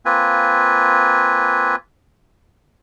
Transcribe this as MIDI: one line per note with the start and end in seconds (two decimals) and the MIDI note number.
0.05 1.76 58
0.05 1.76 60
0.05 1.76 65
0.05 1.76 71
0.05 1.76 80